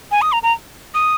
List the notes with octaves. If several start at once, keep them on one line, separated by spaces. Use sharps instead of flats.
G#5
D#6
A#5
A#5
D#6